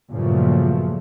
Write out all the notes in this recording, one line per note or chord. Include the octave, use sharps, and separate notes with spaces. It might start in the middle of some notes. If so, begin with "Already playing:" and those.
G2 A#2 C#3 F3 F#3 A3